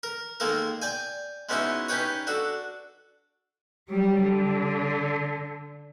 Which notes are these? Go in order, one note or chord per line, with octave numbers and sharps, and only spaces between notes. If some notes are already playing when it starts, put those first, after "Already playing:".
A#4
D#3 G#3 A#3 A4 A#4
D5 G5 G#5
G#3 B3 C#4 D#4 E4 F#4
C#4 D#4 G4 B4 C#5
D4 F#4 A4
F#3 G3
D3